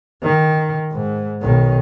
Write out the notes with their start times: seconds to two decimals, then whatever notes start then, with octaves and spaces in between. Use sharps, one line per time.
0.23 D#3
0.91 G#2
1.42 B1 D#3